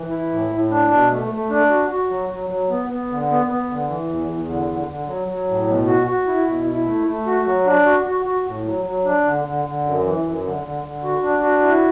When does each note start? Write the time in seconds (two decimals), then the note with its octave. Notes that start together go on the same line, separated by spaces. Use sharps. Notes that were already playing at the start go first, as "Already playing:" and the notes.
Already playing: E3
0.11 E4
0.31 A2
0.52 A2
0.71 D4
0.90 B2
1.11 A3
1.31 A3
1.50 D4
1.70 F#4
1.91 F#4
2.10 F#3
2.29 F#3
2.50 F#3
2.70 B3
2.90 B3
3.09 D3
3.29 B3
3.48 B3
3.69 D3
3.89 E3
4.08 E2
4.28 E2
4.48 D3
4.69 D3
4.88 D3
5.07 F#3
5.28 F#3
5.48 A2
5.67 B2
5.87 F#4
6.07 F#4
6.27 E4
6.47 B2
6.67 E4
6.87 A3
7.06 A3
7.27 F#4
7.46 F#3
7.66 D4
7.86 F#4
8.06 F#4
8.26 F#4
8.46 A2
8.65 F#3
8.85 F#3
9.05 D4
9.25 D3
9.44 D3
9.65 D3
9.85 F#2
10.04 E3
10.24 F#2
10.44 D3
10.64 D3
10.83 D3
11.04 F#4
11.23 D4
11.43 F#4
11.63 E4